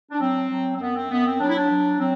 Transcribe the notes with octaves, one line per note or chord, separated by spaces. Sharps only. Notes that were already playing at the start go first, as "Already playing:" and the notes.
D4
F#3 C4
F#3
C4
F#2 B3
C4
F#2 B3
C4
F#3 D4
E4
D4
F#3
F#3 C4